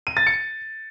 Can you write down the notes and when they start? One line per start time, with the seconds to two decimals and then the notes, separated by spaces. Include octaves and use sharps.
0.07 D#7
0.17 A6
0.27 C#7